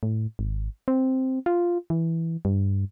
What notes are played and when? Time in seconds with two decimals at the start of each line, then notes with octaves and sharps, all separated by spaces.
0.03 A2
0.39 G#1
0.88 C4
1.46 F4
1.90 E3
2.45 G2